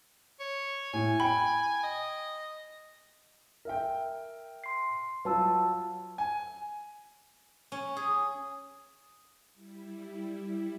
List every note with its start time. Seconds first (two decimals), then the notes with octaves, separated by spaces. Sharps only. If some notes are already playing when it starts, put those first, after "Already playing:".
0.40 C#5
0.93 A2 G#5
1.20 G5 B5
1.83 D#5
3.65 A#4 E5 G5
4.64 C6 C7
5.25 F#3 F4 B4 A5 E6
6.18 G#5
7.72 C#4
7.97 G#4
9.53 G3 E4